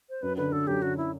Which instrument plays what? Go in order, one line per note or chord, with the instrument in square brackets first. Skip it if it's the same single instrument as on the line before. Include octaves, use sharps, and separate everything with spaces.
[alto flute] C5
[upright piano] F#2 [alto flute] B4
[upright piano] D3 [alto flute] B4
[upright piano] D3 [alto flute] A4
[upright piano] F#2 [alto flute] G4
[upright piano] D3 [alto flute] F#4
[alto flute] E4